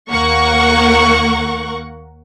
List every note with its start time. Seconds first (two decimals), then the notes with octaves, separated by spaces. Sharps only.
0.11 D#2 A#3 A#4 F#5 C#6